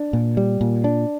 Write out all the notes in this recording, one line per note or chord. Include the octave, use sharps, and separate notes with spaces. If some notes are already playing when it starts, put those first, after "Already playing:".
Already playing: D4
A#2
G3
A#2
D4